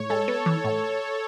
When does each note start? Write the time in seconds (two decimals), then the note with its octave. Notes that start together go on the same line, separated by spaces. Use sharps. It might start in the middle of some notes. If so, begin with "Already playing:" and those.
Already playing: A2 C#5
0.09 G#3 A4
0.28 B3
0.46 E3
0.64 A2